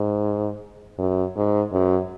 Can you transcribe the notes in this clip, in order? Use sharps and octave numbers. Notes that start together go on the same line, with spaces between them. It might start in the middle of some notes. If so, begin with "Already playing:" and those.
Already playing: G#2
F#2
G#2
F#2